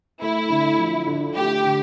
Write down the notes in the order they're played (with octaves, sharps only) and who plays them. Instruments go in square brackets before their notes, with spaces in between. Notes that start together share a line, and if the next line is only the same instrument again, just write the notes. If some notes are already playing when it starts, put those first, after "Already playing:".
[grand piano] A3 [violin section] E4
[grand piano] D3
F3
D3
[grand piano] A3 [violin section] G4
[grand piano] D3